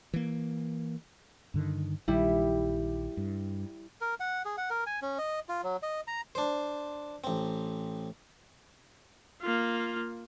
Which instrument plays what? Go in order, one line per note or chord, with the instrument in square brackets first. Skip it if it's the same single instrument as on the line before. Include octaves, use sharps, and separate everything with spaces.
[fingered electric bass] E3 A#3
[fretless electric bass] G2 D3 D#3
[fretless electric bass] A#1 D#3 [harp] G3 E4
[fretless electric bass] G2
[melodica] A#4
F#5
G#4
F#5
A#4
G#5
C#4
D#5
F4
F#3
D#5
A#5
[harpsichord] D4 C5
A1 C4
[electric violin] A#3 F4